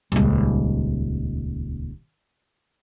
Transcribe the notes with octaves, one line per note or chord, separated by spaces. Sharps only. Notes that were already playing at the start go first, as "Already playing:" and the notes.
D#1 C#2